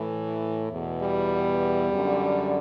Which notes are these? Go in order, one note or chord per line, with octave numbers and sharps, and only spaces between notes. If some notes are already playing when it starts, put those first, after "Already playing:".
Already playing: A2 E3
E2 B2
G3
F#2 D3